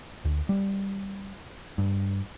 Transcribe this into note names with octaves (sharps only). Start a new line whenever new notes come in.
D2
G3
G2